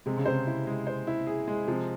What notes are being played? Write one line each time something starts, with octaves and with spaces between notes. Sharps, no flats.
C3 G#3
C#3
C3 C5
E4
G#3
C5
E4
G#4
G#3
C3 F3